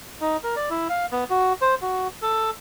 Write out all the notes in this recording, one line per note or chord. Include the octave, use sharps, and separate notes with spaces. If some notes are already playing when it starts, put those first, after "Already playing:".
D#4
A#4
D5
E4
F5
B3
F#4
C5
F#4
A4